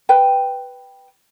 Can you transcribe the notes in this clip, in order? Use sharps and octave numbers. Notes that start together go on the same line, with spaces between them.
B4 G5